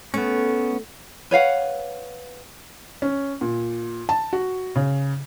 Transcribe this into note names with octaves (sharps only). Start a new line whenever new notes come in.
A3 B3 C#4
B4 C#5 F5 F#5
C#4
A#2
A5
F#4
C#3